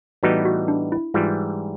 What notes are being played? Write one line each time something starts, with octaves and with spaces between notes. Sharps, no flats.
A2 E3 G3 B3 D#4 F#4
F#4
D4
E4
G#2 E3 G3 F4